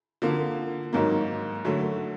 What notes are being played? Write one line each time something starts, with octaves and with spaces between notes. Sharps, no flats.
D3 F3 A#3
G#2 D#3 F#3 A#3
D3 F#3 A3